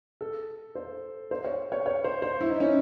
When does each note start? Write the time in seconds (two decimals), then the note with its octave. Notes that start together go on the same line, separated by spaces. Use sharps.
0.21 A4
0.75 C5
1.31 C5
1.44 C#5
1.72 C#5
1.86 C#5
2.04 C5
2.22 C5
2.41 E4
2.50 D#4
2.60 C#4